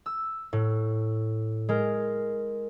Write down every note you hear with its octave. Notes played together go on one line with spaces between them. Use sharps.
E6
A2
G#3 A#4